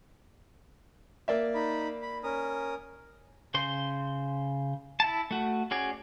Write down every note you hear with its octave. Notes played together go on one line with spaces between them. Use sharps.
A#3 D5 E5
D#4 B5
B5
C#4 A#4 D#6
C#3 C5 C6
E4 A5
A3 F#4
C#4 F#4 G#4 D5